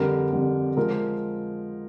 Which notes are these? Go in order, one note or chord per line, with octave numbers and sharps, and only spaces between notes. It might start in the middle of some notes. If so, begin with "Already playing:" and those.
Already playing: F2 D3 G3 A#4
F2 D3 G3
F3 G#3 A#4